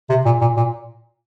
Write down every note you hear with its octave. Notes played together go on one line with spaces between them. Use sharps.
C3
A#2
A#2
A#2